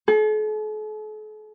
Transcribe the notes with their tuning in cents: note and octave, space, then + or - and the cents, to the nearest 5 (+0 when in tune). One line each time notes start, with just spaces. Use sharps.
A4 -45